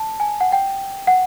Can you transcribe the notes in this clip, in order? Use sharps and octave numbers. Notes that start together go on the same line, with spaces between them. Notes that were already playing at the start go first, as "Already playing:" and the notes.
Already playing: A5
G#5
F#5
G5
F#5